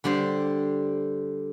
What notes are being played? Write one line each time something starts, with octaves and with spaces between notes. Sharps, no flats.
D3 G3 G4 C5